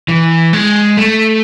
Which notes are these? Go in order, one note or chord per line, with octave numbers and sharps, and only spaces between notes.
E3
G#3
A3